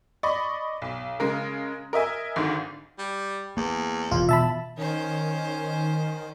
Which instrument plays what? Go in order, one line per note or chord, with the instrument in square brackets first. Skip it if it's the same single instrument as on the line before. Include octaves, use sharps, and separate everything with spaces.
[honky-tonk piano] D5 D#5 B5 C#6
B1
C#3 G#3 A#4
A#4 D#5 E5 G#5
G#1 G#2 D3 D#3
[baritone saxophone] G3
[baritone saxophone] E2 [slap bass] A#3
[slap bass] E1 [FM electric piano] F4
[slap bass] B2 E3 [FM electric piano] E5 A5 B5
[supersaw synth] D#3 [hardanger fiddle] C#4 C5